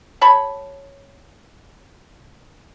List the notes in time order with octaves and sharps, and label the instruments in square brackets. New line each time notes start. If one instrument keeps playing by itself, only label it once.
[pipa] G4 C#5 A5 B5